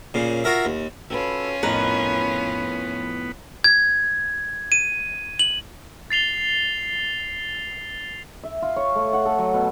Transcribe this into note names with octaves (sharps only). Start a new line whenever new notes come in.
A#2 C#3
F4 F#4 A#4 E5
D#2
C#4 F4 F#4 A4 B4 E6
F2 A2 B3 D#4 A#4 B4
G#6
D#7
F#7
A6 C7 F7 G7
E5
F4
C#5
A3
F#5
A4
F#3
B2